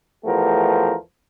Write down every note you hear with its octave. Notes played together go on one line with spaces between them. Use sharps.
E2 F3 A3 B3 G4 A#4